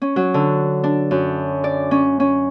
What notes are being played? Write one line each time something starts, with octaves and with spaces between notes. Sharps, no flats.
C#4
F#3
D3
D4
F#2
D5
C#4
C#4